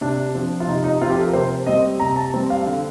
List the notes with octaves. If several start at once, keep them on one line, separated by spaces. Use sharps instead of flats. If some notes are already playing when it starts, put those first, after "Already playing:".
C3 D4
F3 C4
F4
C3 D#4
D#4
F3 C4 F4
G4
A4
A#4
C3 C5
G3 C4 D#5
C3 A#5
A5
G3 C4
F5
D3